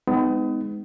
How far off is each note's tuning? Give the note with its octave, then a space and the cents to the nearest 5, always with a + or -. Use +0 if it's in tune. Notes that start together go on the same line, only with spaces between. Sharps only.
G#3 +0 B3 +40 D#4 +0